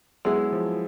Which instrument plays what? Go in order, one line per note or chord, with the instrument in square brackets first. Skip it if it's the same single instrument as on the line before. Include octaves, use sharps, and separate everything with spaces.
[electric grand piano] F#3 [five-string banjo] G#3 B3 E4 G#4
[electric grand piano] F3